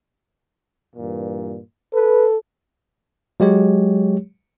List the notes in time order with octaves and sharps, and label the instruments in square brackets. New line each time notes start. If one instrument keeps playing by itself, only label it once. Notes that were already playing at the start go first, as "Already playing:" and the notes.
[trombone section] G2 A#2 E3
[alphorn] A4 [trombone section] B4
[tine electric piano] F#3 G#3 G4 C#5